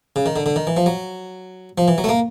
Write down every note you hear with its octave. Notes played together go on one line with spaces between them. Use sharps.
C#3
D#3
D3
D3
D#3
E3
F3
F#3
F3
E3
F#3
A3
A#3